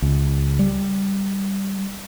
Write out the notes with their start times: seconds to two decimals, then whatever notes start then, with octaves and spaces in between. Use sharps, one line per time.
0.02 C#2
0.59 G3